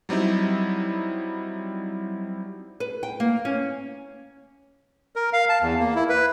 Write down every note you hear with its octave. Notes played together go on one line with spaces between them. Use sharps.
F#3 G3 C4 D#4 E4
B4
G5
A#3
C#4
A#4
F5
A5
E2
A#3
E4
B4